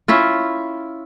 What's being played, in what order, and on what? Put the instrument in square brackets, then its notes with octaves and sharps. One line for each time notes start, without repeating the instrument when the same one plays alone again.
[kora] C#4 E4 F4